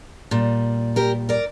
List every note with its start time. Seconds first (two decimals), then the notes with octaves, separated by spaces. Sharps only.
0.31 A#2 G3
0.96 G4 A#4
1.29 A#4 D5